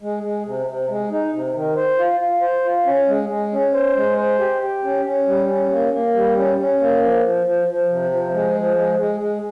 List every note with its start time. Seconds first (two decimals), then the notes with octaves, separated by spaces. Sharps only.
0.02 G#3
0.23 G#3
0.45 C3
0.67 C3
0.89 G#3
1.11 D#4
1.33 C3
1.54 D#3
1.76 C5
1.99 F4
2.20 F4
2.42 C5
2.64 F4
2.86 C#4
3.08 G#3
3.29 G#3
3.52 C#4
3.73 C5
3.96 G#3
4.17 C5
4.39 G4
4.61 G4
4.83 C#4
5.05 C#4
5.27 G3
5.48 C#4
5.70 A#3
5.92 A#3
6.14 G3
6.36 C#4
6.58 C#4
6.80 A#3
7.02 F3
7.24 F3
7.46 F3
7.68 F3
7.89 C3
8.11 F3
8.33 G#3
8.55 F3
8.77 G#3
8.99 G#3
9.20 G#3